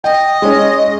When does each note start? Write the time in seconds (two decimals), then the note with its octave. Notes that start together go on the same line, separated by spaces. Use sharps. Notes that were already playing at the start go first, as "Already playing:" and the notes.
0.04 D#5 G5
0.42 G#3 C#4